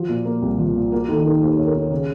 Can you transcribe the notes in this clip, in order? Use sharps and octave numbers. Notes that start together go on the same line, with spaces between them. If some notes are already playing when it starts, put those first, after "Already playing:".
Already playing: F3 F#4
A#2
A#3
C2
F3
A#2
A#3 F#4
D#3 A4
D#4 A#4
D#2 C5
C#5
A#3
A#4
D#3 C#5
C#3